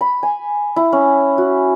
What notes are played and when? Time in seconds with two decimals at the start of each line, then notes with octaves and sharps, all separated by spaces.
0.01 B5
0.23 G#5
0.76 E4
0.92 C#4
1.38 F#4